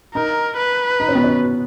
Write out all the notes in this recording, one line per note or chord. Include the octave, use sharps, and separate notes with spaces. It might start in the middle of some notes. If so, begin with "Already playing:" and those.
D#4 A#4
B4
D#4
C#4
B3
C#4